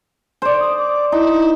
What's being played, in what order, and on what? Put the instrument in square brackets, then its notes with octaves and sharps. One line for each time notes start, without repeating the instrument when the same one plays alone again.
[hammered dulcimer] C5 D5
[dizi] D#6
D6
[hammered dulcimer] D#4 [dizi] E4